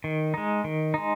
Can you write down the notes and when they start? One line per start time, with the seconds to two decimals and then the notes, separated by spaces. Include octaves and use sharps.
0.04 D#3
0.34 G#3 D#4
0.64 D#3
0.94 G#3 D#4